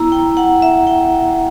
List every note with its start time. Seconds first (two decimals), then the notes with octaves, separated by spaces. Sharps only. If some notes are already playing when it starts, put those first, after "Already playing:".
Already playing: B3 E4 A#5
0.12 G5
0.37 F#5
0.62 E5
0.87 G5